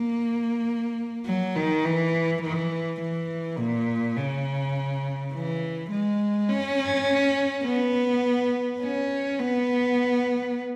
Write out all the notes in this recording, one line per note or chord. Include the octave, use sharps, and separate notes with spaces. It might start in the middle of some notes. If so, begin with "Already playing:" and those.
Already playing: A#3
F#3
D#3
E3
E3
E3
A#2
C#3
E3
G#3
C#4
B3
C#4
B3